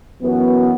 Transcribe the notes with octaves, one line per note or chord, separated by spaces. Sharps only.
F#2 E3 B3 F#4